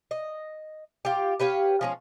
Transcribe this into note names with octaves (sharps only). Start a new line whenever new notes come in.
D#5
F4 G4
G4 B4 C#5 F5
F3 G#3 C#4